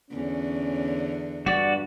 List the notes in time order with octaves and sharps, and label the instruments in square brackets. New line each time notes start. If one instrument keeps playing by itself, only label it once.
[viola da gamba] E2 D3 [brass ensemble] C#4
[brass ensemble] G2 [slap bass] G3 [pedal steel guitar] F#4 D5